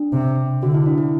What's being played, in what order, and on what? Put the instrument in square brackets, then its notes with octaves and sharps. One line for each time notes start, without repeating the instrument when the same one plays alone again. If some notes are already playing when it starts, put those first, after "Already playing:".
Already playing: [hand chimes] D4
[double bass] C3
[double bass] D3 [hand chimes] F#4
[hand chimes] E4
D4
E4